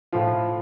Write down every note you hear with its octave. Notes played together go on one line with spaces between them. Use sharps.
A2 F3 F4